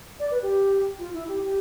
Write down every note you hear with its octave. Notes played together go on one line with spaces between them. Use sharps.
D5
B4
G4
F4
E4
G4
G4